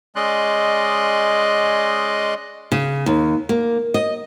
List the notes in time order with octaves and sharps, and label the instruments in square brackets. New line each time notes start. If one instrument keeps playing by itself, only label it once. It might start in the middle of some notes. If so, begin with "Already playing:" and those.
[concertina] G#3 C#4 D5 D#5 C6 F#6
[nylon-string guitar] C#3
D#2
A#3
D#5